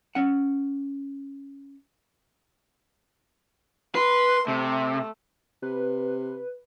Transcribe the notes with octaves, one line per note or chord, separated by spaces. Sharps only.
C#4 F#5
B4 C6
C3 A3
C3 B4